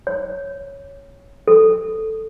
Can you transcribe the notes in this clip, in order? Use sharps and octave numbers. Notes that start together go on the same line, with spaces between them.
C#5
A4